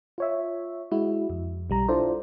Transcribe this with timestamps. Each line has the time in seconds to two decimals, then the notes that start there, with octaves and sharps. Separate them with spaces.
0.18 F4 C#5 E5
0.92 G#3 E4 F#4
1.30 F2
1.70 B1 G3 A#5
1.88 D4 E4 F4 A4 C5 D5